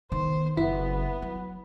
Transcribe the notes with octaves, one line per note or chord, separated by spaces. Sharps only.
D#3 B3 C5
F#1 B3 E4
F#3